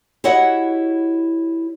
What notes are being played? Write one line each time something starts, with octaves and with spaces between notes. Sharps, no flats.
E4 F#4 G4 C#5 D#5 F#5